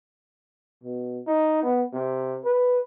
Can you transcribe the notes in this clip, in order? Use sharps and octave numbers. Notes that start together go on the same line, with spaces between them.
B2
D#4
B3
C3
B4